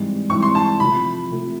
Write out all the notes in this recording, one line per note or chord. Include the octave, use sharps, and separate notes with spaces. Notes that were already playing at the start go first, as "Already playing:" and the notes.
Already playing: G#2 E3 G3 C4 E4
G#2 E3 G3 C4 E4 C#6
C6
A5
C3 F3 A3 B5
C3 F3 A3